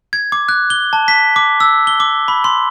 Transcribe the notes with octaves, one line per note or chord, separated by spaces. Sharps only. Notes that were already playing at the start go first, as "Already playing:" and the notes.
G#6
D6
F#6
G7
A5
B6
D6
E6
G7
D6
B5
C6